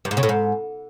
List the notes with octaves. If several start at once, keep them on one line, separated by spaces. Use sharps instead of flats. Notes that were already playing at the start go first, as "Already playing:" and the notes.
G2
G#2
C#3
A2
G#2